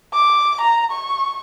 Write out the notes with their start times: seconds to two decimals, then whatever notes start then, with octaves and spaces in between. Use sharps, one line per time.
0.13 D6
0.61 A#5
0.92 C#6